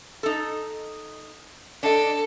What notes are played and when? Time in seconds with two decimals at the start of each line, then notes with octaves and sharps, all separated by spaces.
0.23 D#4 A4
1.83 D4 A4 D#5